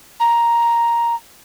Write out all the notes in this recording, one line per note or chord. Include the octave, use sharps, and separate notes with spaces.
A#5